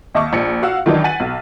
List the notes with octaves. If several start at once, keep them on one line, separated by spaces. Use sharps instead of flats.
D#2 D#5 E5 A5 C#6 D6
A#1 C#7
F#4 F5 F#5 E6
D#3 E3 F#3 D4 D#4
F#5 G#5 A6 B6 D#7 F#7
B1